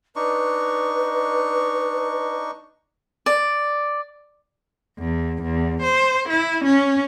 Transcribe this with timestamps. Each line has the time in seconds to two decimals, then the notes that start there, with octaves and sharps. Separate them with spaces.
0.16 D4 D#4 B4 C#6
3.26 D5
4.98 E2
5.43 E2
5.83 C5
6.29 E4
6.65 C#4